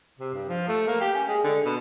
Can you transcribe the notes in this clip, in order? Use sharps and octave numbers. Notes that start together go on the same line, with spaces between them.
C3
G2
F3
A3
A#3
G4
C#4
G#3
D3
B2